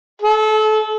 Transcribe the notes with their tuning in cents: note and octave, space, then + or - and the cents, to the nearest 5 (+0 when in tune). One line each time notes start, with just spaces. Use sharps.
A4 -30